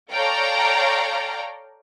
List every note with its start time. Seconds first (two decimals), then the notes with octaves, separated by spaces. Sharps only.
0.12 A4 C#5 D5 F5 G5 A#5